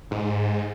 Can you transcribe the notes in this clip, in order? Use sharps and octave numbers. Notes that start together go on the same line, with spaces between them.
G#2